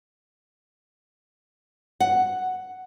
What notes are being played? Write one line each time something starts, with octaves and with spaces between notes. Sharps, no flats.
F#5